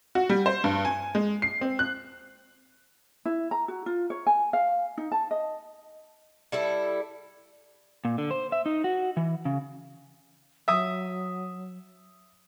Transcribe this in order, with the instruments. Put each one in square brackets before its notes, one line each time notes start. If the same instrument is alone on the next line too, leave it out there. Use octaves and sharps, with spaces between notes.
[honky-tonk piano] F#4
G3
C5
G2
G#5
G#3
C7
C4
F#6
[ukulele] E4
A#5
F#4
F4
C#5
G#5
F5
D#4
A5
D#5
[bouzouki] G3 E4 A4
[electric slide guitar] A#2
D3
C5
E5
D#4
F#4
E3
C#3
[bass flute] F#3 [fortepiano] E5 D#6